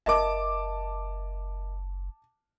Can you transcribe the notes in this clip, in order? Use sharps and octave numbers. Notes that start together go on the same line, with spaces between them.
F#1 A#4 D#5 E5 A5 D6